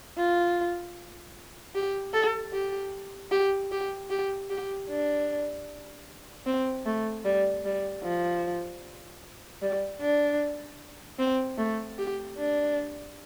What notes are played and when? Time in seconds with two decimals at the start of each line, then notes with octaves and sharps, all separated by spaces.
0.17 F4
1.75 G4
2.13 A4
2.53 G4
3.31 G4
3.72 G4
4.10 G4
4.50 G4
4.89 D4
6.46 C4
6.86 A3
7.25 G3
7.65 G3
8.03 F3
9.62 G3
10.01 D4
11.19 C4
11.58 A3
11.98 G4
12.38 D4